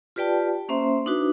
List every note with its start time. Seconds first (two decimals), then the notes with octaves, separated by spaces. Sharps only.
0.16 F4 G4 B4 D5 G5 A5
0.69 A#3 C#4 C5 E5 C6
1.06 D4 D#4 F#4 B4